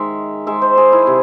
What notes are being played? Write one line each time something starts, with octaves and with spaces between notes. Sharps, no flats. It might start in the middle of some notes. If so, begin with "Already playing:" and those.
Already playing: D#3 G#3 E5
D#3 G#3 E5
C5
G#4
E4
C3